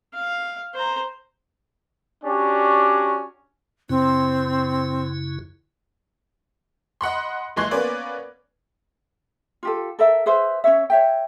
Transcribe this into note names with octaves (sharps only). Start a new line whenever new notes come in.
F5
C5 A#5
C#4 D4 F#4 G4 D5
F#2 C#3 C4 E4
D#5 F#5 B5 C6
F#1 E3 G#3 C6 F#6 G#6
A#3 B3 C#4 B4 D5
F4 G4 A4
A4 A#4 E5
G#4 B4 C5 E5
C#4 F#4 C#5 E5
C#5 E5 G5